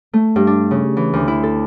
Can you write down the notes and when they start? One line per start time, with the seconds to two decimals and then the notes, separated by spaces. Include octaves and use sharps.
0.13 A3
0.36 G2
0.47 D4
0.71 C#3
0.97 E3
1.13 D2
1.28 E4
1.43 A4